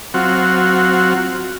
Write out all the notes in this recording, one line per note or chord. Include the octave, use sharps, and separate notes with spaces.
F#3 C4 F4 F#4